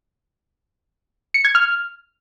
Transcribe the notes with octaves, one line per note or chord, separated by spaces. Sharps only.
C#7
G#6
F6